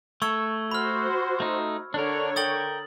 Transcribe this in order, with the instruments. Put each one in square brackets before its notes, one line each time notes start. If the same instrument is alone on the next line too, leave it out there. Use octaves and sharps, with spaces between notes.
[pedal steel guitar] A3 A4 [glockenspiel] C#6 E6 G#6
[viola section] F#4 C5 [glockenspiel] B5 F6
[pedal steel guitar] A3 D#4
[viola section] D3 C#5 [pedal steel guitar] D4 A#4
[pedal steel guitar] A#4 G5 [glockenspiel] D#6 A6 F#7